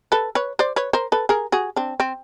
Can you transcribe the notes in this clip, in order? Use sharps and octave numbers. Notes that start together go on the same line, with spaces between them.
A4 B4
B4 C#5
C5 D5
B4 C#5
A#4 C5
A4 B4
G#4 A#4
F#4 G#4
C4 D4
C4